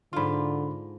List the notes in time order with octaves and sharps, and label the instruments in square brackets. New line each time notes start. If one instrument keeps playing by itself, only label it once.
[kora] G#2 F4 [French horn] D3 [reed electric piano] B5 C6